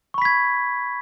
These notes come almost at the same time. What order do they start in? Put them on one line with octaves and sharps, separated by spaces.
C#6 B5 B6 G#6